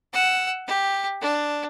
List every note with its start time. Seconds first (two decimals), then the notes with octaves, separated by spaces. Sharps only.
0.13 F#5 E6
0.67 G4
1.21 D4